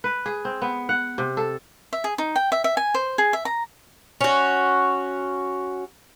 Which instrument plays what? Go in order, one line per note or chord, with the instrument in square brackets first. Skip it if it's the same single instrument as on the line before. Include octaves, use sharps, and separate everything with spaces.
[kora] B4
G#4
C4
B3
F#5
C3
A4
[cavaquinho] E5
G#4
D#4
G5
E5
E5
G#5
C5
G#4
E5
A#5
[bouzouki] C#4 F#4